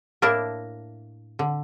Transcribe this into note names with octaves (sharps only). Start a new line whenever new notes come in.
A2 A#3 D4 E4 A#4
D3